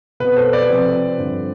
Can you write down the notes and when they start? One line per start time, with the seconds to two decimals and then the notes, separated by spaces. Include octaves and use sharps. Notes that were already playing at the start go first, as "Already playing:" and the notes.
0.20 B2 B3 B4
0.36 A4 C5
0.53 B4 D5
0.70 C3 F3 C4
1.19 G2 D3 F3 C4